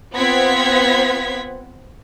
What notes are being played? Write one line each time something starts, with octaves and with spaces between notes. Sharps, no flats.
B3 C4 F4 F#5 G#6 B6